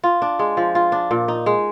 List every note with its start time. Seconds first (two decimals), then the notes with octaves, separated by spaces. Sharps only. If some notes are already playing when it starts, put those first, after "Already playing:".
0.04 F4
0.22 D4
0.39 G#3
0.57 F3
0.75 F4
0.92 D4
1.11 A#2
1.28 D#4
1.46 G#3